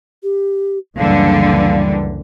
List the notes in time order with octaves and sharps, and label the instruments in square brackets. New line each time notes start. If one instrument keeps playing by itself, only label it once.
[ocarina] G4
[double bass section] F#1 C#2 E3 [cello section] D3 [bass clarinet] G3 [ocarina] F5